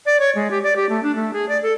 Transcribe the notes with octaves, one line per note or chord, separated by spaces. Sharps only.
D5
C#5
G#3
G4
D5
G4
A3
D4
A3
G#4
D5
A4